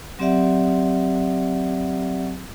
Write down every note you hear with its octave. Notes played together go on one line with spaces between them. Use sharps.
F#3 C4 G4 D5 E5 F#5